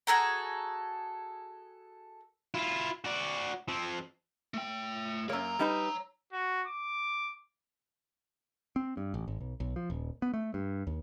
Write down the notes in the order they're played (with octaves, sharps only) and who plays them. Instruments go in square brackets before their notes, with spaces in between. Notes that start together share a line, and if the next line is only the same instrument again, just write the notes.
[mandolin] F#4 G#4 A4 A#5
[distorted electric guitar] E4 F4
F#4 D5
F3 C4
[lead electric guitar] A3 G5
[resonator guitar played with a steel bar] F#2 A#3 [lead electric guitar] C#5 A#5
[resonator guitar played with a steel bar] G3 D#4 B4
[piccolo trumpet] F#4
D6
[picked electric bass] C4
G2
A1
G#1
B1
B1
F3
D#1
B3
A3
G2
D#2